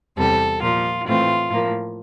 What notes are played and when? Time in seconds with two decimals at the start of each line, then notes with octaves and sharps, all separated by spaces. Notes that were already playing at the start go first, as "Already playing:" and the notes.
0.17 E2 C3 G3 C4 A4
0.62 A#2 F3 A#3 F4
1.06 A2 E3 A3 C4 F4
1.50 A2 F3 A#3